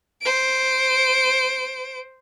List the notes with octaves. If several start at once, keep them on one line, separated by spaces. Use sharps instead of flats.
C5 D7